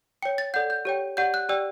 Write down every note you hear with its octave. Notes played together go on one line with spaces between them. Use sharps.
C#5 G5 C#7
A6
A4 D5 F#5 G6
G6
G4 C#5 G5
G4 D5 F#5 G6
F#6
G4 D5 G5 E6